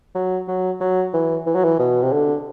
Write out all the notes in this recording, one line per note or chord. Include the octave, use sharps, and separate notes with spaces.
F#3
F#3
F#3
E3
E3
F#3
E3
B2
C3
D3